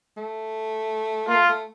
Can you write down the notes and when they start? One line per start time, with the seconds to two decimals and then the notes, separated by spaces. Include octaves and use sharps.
0.17 A3
1.28 A#3 F4
1.35 A3
1.49 A3